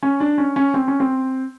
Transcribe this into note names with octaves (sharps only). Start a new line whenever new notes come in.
C#4
D4
C#4
C#4
C4
C#4
C4